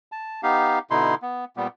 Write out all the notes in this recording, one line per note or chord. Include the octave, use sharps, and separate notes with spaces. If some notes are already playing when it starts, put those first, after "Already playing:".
A5
B3 D#4 G4 F5
B2 D3 D#4 E4 C6
B3
A#2 G3 B3